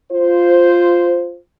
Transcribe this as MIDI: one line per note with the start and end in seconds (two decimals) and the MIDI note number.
0.12 1.37 65
0.12 1.37 72